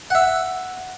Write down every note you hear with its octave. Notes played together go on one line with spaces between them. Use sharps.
E5 F#5